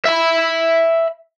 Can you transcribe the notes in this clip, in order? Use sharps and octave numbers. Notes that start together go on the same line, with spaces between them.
E5 B5